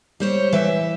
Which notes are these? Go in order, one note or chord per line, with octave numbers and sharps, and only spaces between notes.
G3 C5 C#5
E3 E5